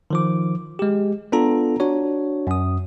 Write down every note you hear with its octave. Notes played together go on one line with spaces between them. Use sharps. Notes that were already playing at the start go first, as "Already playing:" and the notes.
D#3 F3 D6
G#3 G4
B3 D4 F4 A4 A#5
D4 F#4 C#5
F#2 D#6